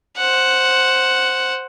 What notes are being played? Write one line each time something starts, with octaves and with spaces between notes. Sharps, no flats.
C5 F#5